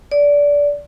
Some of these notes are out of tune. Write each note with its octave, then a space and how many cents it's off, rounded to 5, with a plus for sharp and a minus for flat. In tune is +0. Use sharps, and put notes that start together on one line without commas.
D5 -20